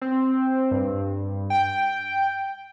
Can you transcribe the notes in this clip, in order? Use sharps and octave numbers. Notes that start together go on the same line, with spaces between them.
C4
G2
G5